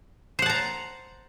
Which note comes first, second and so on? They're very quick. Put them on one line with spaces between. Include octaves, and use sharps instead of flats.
C5 F#5 A5 A#5